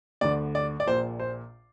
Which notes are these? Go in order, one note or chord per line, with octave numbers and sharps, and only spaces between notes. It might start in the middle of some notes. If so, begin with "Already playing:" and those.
D2 D3 D5
D5
D5
A#1 A#2 C5
C5